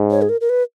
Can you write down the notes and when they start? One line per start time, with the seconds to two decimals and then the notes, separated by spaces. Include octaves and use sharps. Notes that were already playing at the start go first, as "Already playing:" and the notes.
Already playing: G#2
0.11 C#5
0.22 G#4
0.29 A#4
0.41 A#4
0.49 B4